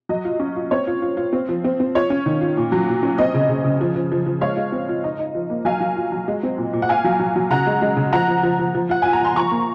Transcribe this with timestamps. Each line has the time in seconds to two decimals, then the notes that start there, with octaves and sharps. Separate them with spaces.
0.09 F#3 D#5
0.25 F4
0.40 C#4
0.56 F4
0.71 C4 C#5
0.87 F4
1.02 F4
1.17 F4
1.33 C4
1.49 F3
1.64 C4
1.80 C4
1.95 F4 C#5
2.10 C#4
2.26 D#3
2.41 F4
2.57 A#2
2.72 F#3
2.88 A#2
3.03 C#4
3.18 C4 D#5
3.34 C#3
3.49 C#3
3.64 C#3
3.81 F3
3.96 F3
4.12 F3
4.26 F3
4.41 G#3 C#5 F5
4.57 G#3
4.72 C4
4.89 F4
5.04 D#4
5.19 D#4
5.35 F3
5.50 A#3
5.65 F#3 F5 G#5
5.81 F#3
5.96 F4
6.12 F#3
6.28 G#3
6.43 C4
6.58 A#2
6.73 A#2
6.82 F#5
6.89 F4 F5 G#5
7.04 F#3
7.20 F#3
7.36 F#3
7.50 C#3 F#5 A#5
7.67 G#3
7.82 G#3
7.97 C#3
8.12 F3 F#5 A#5
8.28 F3
8.43 F3
8.59 F3
8.75 F3
8.89 F4 F#5
9.02 F4 G#5
9.13 A#5
9.20 F4 C6
9.36 F3 A#5 C#6
9.51 A#3